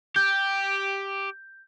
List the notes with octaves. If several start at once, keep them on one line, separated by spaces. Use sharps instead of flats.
G4 G6